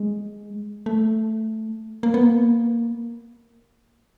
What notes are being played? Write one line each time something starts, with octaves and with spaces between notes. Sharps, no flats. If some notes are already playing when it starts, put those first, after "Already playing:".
Already playing: G#3
A3
A#3
B3
A#3